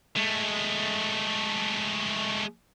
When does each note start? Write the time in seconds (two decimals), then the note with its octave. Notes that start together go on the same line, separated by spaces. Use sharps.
0.17 G#3 A3